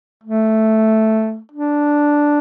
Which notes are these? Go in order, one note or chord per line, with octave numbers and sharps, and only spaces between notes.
A3
D4